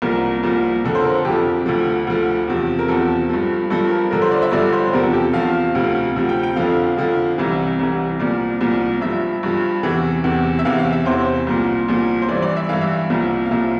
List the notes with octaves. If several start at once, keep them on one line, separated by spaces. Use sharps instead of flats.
C2 A#2 F3 A#4
C2 A#2 F3
F2 D3 F3 A4
C5
A#4
A4
F2 D3 F3 G4
D2 D3 F3
D2 D3 F3
E2 C3 F3
A#4
E2 C3 F3 A4
G2 F3
G2 F3 A4
A#4
G2 D3 F3 A#4
C5
D5
E5
G2 D3 F3 D5
C5
E2 C3 F3 A#4
A4
G4
A4
E2 C3 F3 F5
D2 C3 F3
D2 C3 F3
G5
G5
F2 D3 F3 F5
F2 D3 F3
C2 C3 E3
C2 C3 E3
C2 A#2 F3 D5
C2 A#2 F3
G2 F3 E5
G2 F3
E2 C3 E3
E2 C3 E3
E5
E2 C3 E3 F5
F5
E5
E2 C3 E3 C5
C2 A#2 F3
C2 A#2 F3
C5
G2 E3 D5
D5
E5
G2 E3 F5
E5
C2 A#2 F3
F5
C2 A#2 F3 E5